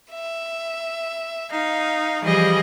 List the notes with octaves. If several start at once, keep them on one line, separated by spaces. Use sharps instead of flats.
E5
D#4 F5
E3 F3 G3 G#4 D#5